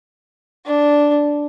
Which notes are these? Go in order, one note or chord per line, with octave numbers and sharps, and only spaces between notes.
D4